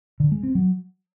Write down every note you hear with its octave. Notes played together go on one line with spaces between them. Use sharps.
D3
G#3
C4
F#3